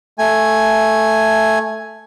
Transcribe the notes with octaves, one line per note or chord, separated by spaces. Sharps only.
A3 G#5